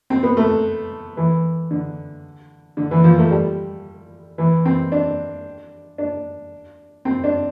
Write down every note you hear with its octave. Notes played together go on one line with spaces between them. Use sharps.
C4
B3
A3
E3
D3
D3
E3
F3
A3
G3
E3
C4
D4
D4
C4
D4